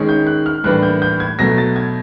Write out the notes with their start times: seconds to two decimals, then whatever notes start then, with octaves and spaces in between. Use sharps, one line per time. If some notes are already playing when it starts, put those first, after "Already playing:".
Already playing: D#3 G#3 C#4
0.09 G6
0.27 F#6
0.46 F6
0.64 A2 E3 G3 A#3 D4 F#6
0.83 G6
1.02 G6
1.20 G#6
1.39 B2 F#3 A3 A#6
1.58 A6
1.76 G#6